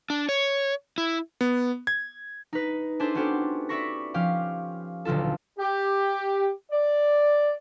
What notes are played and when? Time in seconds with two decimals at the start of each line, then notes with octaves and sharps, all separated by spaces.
0.10 D4
0.29 C#5
0.98 E4
1.41 B3
1.87 G#6
2.53 D#4 B4
3.00 D4 E4 G#4 A4 C5 A5
3.15 B3 C#4 F#4 G4 A4 C5
3.69 D5 E5 B5 C#6 A#6
4.14 F3 C#4 G4 F5
5.05 D#1 B1 D3 F4 A4
5.59 G4
6.72 D5